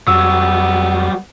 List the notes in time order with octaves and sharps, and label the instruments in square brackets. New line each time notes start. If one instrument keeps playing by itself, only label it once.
[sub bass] F2 [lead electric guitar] F#3 G3 [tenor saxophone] B3 [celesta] E6